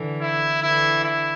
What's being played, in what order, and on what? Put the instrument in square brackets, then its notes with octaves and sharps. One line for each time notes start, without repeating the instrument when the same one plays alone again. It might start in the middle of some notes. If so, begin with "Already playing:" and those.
Already playing: [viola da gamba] D3 E3
[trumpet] E4
[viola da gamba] D3 E3 [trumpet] E4
[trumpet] E4